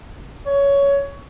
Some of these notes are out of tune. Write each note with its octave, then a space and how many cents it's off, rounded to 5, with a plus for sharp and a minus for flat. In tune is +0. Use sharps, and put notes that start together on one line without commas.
C#5 +15